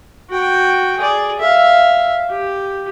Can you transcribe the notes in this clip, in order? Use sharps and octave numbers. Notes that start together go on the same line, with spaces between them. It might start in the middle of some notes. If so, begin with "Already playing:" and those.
F#4 G5
G#4 D5
E5 F5
G4